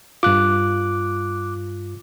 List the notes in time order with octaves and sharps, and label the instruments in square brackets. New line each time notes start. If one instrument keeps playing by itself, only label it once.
[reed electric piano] G2 F4 [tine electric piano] D6 F#6